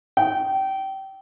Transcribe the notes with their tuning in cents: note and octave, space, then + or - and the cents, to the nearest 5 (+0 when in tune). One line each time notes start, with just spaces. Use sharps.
G5 -25